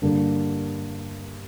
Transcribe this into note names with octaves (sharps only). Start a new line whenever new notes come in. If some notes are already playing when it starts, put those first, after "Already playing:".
G2 D3 G3 A#3 D4